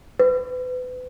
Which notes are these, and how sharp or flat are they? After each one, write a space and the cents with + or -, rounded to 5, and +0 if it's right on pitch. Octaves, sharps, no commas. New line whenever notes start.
B4 +35